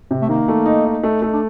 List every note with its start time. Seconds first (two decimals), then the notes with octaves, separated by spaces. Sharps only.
0.11 C3
0.22 A3
0.29 D#3 A#3
0.48 A3
0.66 D#4
0.85 D#4
1.03 A3
1.22 A3
1.33 D4